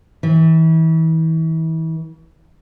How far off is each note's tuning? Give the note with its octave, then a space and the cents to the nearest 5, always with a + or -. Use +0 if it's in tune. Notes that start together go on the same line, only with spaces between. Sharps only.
E3 -35